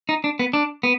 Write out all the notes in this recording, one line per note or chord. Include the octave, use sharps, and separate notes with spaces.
D#4
D4
B3
D4
B3